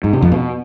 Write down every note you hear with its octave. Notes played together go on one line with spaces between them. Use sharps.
G#2
C3
F2
B2